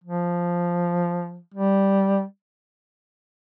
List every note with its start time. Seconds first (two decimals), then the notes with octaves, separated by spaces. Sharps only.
0.04 F3
1.54 G3